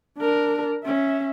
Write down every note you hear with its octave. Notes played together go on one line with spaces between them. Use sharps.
D4 A#4
C#4 E5